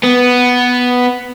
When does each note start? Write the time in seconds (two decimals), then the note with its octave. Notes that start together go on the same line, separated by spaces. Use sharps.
0.04 B3